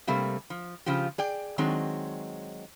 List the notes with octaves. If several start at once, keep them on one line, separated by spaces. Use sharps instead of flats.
C3 G3 A3 A#3 C4
F3
C#3 F3 F4 G4
G#4 D5 G5
D#3 F#3 G#3 C4